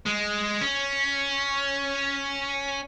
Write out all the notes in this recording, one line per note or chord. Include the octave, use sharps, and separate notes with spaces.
G#3
C#4